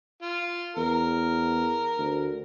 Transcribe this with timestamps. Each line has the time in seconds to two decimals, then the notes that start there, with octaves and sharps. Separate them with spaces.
0.22 F4
0.77 E2 A#4
1.98 D2